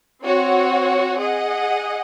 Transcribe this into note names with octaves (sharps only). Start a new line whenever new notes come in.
C4 F#4 C#5 F#5
G#4 D#5 F#5